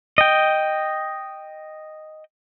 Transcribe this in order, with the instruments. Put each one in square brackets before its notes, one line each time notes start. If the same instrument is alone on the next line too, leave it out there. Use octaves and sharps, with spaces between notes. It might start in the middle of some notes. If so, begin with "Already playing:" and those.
[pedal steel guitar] D#5 G5